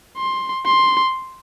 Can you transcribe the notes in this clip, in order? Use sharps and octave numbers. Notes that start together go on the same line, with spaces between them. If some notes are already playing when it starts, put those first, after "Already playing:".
C6
C6